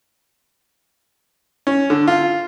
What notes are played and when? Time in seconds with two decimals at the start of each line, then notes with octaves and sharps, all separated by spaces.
1.67 C#4
1.90 D3
2.07 F4